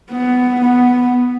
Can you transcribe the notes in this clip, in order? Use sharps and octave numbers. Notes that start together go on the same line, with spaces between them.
B3
B3